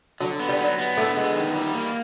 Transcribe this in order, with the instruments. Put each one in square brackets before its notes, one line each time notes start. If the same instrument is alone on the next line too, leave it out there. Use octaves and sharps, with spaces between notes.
[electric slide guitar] D3 [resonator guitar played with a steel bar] F#3
[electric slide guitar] B3
[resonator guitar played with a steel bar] G3
[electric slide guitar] F#3
B3
[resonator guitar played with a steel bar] A2 A3 [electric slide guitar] D3
[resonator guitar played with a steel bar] G#3 [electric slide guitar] B3
[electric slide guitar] D#3
G3
A#3